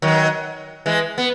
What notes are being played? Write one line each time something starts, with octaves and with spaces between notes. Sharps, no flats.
D#3 F#3
E3 G#3
B3